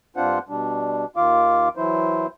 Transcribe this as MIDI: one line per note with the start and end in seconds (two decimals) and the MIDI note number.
0.17 0.39 43
0.17 0.39 60
0.17 0.39 62
0.17 0.39 65
0.17 0.39 72
0.17 0.39 78
0.49 1.05 47
0.49 1.05 55
0.49 1.05 62
1.16 1.69 39
1.16 1.69 51
1.16 1.69 65
1.16 1.69 77
1.16 1.69 86
1.77 2.27 52
1.77 2.27 54
1.77 2.27 64
1.77 2.27 72